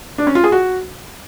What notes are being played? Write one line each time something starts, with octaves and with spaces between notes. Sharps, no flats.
D4
C#4
F4
G#4
F#4